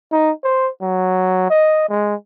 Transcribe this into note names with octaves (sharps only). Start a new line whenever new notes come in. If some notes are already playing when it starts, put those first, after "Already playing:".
D#4
C5
F#3
D#5
G#3